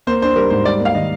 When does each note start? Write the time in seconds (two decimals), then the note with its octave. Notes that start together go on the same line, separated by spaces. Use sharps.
0.07 A#3 C5
0.22 D4 C5
0.36 G3 A#4
0.50 G#2 C5
0.65 G3 D5
0.80 A#3
0.85 F5
0.94 D#3 D#5